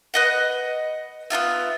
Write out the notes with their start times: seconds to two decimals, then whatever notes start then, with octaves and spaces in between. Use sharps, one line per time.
0.14 B4 D#5 F#5
1.30 B3 D#4 F4 E5